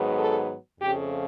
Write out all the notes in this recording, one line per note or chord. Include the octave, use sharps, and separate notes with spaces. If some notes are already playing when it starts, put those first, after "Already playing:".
Already playing: G#2 D#3 F#3 B3
A4
F2 C#3 F3 A3 G4